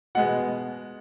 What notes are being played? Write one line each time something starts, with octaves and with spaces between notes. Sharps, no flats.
B2 G#3 B3 F#5